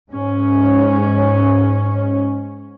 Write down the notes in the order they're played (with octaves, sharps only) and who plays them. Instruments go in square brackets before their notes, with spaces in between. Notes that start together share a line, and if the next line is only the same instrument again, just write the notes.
[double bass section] G#2 C#4